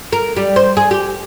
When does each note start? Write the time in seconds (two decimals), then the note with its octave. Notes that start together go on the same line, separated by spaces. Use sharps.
0.12 A#4
0.36 G3
0.56 C5
0.77 G#4
0.91 G4